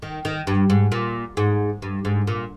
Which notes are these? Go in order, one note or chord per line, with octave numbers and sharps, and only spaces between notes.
D#3
D#3
G2
G#2
A#2
G#2
G2
G#2
A#2